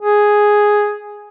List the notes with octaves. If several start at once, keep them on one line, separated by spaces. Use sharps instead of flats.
G#4